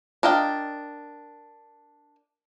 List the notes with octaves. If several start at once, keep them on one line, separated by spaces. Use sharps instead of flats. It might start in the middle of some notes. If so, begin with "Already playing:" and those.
D4 A#4 D#5 F5 G5